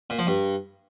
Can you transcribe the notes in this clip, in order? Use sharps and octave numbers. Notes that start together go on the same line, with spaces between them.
A#2
F3
G2